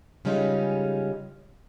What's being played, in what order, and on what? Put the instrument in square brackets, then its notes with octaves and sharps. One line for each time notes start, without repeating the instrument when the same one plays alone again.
[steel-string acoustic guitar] C#3 G3 G#3 C#4 D#4 F4